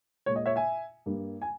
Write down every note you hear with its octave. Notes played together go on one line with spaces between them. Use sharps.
A#2 G#3 C#5
D#5
C#5 E5
E5 G#5
G2 G3 A#3
G#5